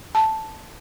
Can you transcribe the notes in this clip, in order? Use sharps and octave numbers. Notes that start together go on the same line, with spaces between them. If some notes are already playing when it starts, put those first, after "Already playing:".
A5